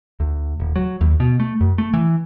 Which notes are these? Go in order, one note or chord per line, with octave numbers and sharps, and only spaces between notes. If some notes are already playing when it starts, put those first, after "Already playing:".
D2
D#1
F#3
D#2
B2
A3
F#2
A3
E3